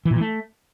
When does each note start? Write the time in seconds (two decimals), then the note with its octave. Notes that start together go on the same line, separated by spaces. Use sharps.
0.05 E3
0.11 A#2
0.16 E3
0.21 A3